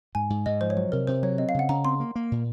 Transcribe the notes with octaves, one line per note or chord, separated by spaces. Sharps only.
G#2 G#5
G#2
G#2 D#5
F3 C5
C#5
F#3 C5
C3 A#4
C3 C5
F#3 C#5
C4 D#5
F5
C#3 F#5
C#3 A#5
C4 C6
A#3
A#3
A#2